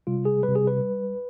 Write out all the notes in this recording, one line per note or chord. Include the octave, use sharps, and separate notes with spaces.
C3 G3 F4
G#4
C3 G3 B4
G#4
B4
G3